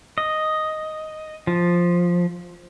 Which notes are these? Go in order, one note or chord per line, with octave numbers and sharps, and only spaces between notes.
D#5
F3